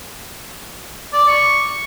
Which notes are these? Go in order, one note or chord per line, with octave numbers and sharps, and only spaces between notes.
D5
C#6